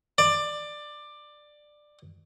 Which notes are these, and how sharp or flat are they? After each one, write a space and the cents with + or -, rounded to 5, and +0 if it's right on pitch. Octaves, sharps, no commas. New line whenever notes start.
D5 +15